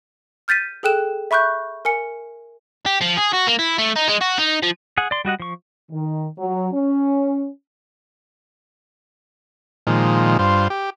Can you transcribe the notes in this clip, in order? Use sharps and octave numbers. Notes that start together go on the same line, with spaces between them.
F6 G6 A6 B6 D#7
G#4 A4 G5 F#6 E7
E5 B5 C#6 F#6 G6
A#4 G#5 C#7
G4
F3
G#4
F#4
A#3
E4
A3
D#4
G#3
F#4
D#4
F3
G#4 F#5
D5 C6
G3 F#4 D#5 F#5
F3 C#6
D#3
F#3
C#4
A#2 D#3 F3 G#3
G2 F4 C5
G4